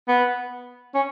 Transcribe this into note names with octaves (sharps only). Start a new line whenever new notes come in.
B3
C#4